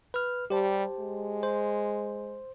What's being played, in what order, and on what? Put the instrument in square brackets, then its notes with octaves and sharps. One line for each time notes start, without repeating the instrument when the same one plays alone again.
[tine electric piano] B4 F6
[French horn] G3 [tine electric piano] G4 C5 A5
[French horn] G#3
[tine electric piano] C5